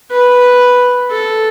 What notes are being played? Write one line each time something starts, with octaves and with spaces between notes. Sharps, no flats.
B4
A4